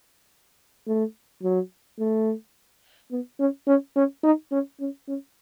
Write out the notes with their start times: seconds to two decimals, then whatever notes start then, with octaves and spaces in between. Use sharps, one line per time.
0.87 A3
1.43 F#3
1.99 A3
3.11 B3
3.39 C#4
3.67 C#4
3.96 C#4
4.24 D#4
4.52 C#4
4.80 C#4
5.08 C#4